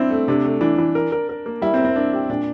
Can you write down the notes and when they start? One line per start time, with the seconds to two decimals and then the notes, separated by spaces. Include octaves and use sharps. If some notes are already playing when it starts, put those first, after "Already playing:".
Already playing: C4 D4 E4
0.10 A3
0.28 C3 D4
0.45 A3
0.61 E3 D4
0.78 E3
0.95 A#4
1.12 A#4
1.29 A#4
1.46 A#3
1.62 G3 E4
1.74 C4
1.79 A#4
1.85 C4
1.95 D4 A#4
2.13 G4
2.30 A#2 D4